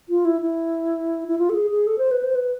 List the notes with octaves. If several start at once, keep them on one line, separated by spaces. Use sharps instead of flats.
F4
E4
E4
E4
F4
A4
G#4
G#4
A4
C5
B4
C5
B4